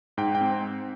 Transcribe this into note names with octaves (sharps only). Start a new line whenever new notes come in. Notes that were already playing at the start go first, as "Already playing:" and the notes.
G#2 G5
G5
C4